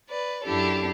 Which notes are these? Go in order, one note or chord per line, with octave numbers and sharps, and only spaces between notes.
B4 D5
F#2 D4 E4 G4 A4